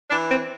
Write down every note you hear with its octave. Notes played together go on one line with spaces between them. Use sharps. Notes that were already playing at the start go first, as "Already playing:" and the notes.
E3 D4
C4